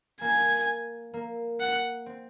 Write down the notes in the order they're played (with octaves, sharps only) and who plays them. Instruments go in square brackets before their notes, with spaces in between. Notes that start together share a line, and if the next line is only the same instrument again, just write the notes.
[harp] A#3 [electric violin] G#5
[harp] A#3
[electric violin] F#5
[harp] C4